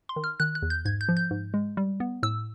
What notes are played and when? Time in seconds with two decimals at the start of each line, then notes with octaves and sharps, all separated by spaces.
0.09 C6
0.16 D#3
0.24 F6
0.40 D#3 F#6
0.55 F#6
0.62 E2
0.70 G6
0.85 G#2 G#6
1.01 G6
1.09 F3
1.17 G6
1.31 G#2
1.54 G#3
1.77 G3
2.00 B3
2.23 A2 E6